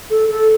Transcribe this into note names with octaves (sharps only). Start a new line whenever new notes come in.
A4
A4